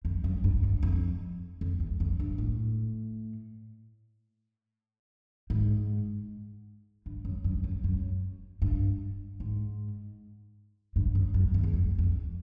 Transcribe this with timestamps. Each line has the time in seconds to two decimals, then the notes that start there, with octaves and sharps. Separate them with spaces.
0.05 F2
0.24 F#2
0.44 G2
0.63 G2
0.83 F2
1.61 F2
1.80 E2
2.00 F2
2.19 G2
2.38 A2
5.50 G#2
7.06 G2
7.25 F#2
7.44 F#2
7.64 F#2
7.84 F#2
8.62 G2
9.40 G#2
10.96 G2
11.15 F#2
11.34 F#2
11.54 F2
11.63 E2
11.73 F2
11.98 F2